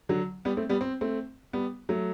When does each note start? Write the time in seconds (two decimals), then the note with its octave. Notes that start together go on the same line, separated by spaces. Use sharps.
0.09 D3 F#3
0.45 G3 B3
0.57 A3 C4
0.69 G3 B3
0.81 C4
1.01 A3 C4
1.53 G3 B3
1.89 F#3 A3